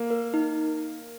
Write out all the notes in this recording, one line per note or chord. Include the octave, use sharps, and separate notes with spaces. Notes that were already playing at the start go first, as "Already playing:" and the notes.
Already playing: A#3
A#4
D#4